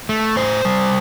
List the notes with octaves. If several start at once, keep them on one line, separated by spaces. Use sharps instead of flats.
A3
A2 C5
G3